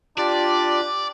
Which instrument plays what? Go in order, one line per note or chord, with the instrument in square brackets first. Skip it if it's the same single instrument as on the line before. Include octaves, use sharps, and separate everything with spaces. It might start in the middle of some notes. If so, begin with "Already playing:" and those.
[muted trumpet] D4 [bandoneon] F4 G4 [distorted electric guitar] D5